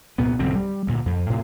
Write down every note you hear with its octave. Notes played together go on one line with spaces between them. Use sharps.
C2 A#2 B3
B1 G2 D3 C4
G3
D2 A#2
F2
A2 C3